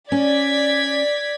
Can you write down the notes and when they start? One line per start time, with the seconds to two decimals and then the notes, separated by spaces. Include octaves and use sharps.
0.12 C#4 D5 G#6 B6